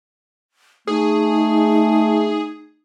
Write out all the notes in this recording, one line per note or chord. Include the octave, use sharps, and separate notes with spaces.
A3 D#4 G#4